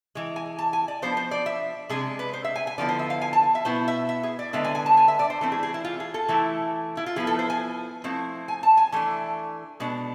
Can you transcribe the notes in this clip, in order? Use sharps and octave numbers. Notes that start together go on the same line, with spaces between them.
E3 G#3
G#5
A5
G#5
D5
F3 B3 D4 C5
C5
D5
E5
C3 G#3 D4 G#4
B4
C5
E5
G#5
G#5
D3 F3 B3 E4 D5
C5
E5
F5
G#5
A5
E5
B2 B3 E4 C5
E5
E5
G#4
D5
D3 G#3 B3 D4 E5
G#5
G#5
A5
G#5
E5
D5
C5
E3 A3 C4 A4
G#4
G#4
E4
F4
G#4
A4
E3 A3 E4
E4
F4
F3 B3 E4 G#4
A4
C5
G#5
F3 A3 C4 E4
G#5
A5
G#5
E3 A3 D4
B2 G#3 D4